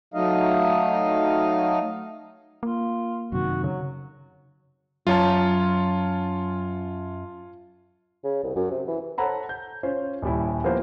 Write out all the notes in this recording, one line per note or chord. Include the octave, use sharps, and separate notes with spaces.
F#3 A3 D#4 D#5 F5
A#3 F4
F#2 C3 D#3 F#4
C#3 F#3
F#2 F4 C#5 A5
C#3
C2
F#2
C3
E3
A4 C5 C#5 F#5 A#5 B5
G6
C#4 F4 C5
D#1 G3 E4
F3 A#3 B3 E4 G4 C5